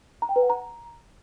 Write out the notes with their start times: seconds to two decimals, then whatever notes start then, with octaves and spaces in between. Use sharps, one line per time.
0.22 A#5
0.29 G5
0.36 B4
0.43 F#5
0.50 A#5